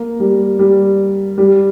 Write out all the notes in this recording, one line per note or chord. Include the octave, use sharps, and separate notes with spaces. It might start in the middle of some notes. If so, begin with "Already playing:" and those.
Already playing: A#3
G3
G3
G3